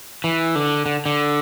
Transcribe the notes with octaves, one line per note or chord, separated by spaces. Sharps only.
E3
D3
D3
D3